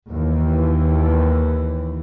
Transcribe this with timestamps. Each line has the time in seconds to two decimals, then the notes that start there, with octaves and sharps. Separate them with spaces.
0.10 D#2 E3